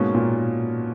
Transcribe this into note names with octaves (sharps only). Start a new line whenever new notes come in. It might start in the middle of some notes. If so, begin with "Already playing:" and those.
Already playing: G#2 B2 A#3 C#4
A#2